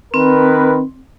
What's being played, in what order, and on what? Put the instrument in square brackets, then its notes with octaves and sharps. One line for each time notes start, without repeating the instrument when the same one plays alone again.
[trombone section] D#3 A#4 B4 [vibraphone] C4